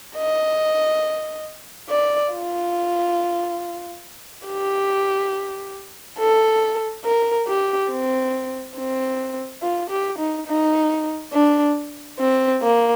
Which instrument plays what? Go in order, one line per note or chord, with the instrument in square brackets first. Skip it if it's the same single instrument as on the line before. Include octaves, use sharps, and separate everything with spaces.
[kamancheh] D#5
D5
F4
G4
A4
A#4
G4
C4
C4
F4
G4
D#4
D#4
D4
C4
A#3